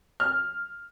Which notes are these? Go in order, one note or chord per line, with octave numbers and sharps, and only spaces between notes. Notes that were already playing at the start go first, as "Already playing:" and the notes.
F6